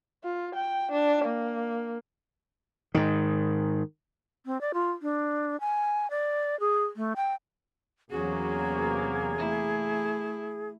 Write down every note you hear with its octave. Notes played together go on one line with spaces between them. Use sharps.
F4
G5
D4
A#3
G#2 D#3
C4
D5
F4
D4
G#5
D5
G#4
A3
G5
E2 C3 F#3 A#3 C#4 F#4 G#4
A3 E4